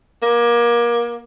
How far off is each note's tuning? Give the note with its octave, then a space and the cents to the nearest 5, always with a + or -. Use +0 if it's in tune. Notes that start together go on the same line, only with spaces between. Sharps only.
A#3 +25